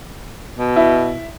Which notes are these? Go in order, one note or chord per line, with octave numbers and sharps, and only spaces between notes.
B2
E4